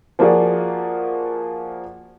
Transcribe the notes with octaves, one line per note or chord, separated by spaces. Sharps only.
F3 A#3 F4 F#4 G#4 D5